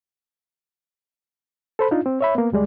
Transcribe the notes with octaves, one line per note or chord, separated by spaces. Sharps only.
A4 C5 B5
D4 D#4 F4
C4
C#5 E5 B5
A#3 B3
D2 G3 G#3 D5